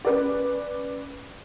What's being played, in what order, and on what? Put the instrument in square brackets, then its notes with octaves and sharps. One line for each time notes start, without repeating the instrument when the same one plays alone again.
[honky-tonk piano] C#4 B4 D5